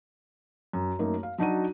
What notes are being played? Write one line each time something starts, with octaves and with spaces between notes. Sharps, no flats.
F#2
F#2 A3 A#3 D#4
F5
F#3 D4 D#4 F#4 F#5 D#7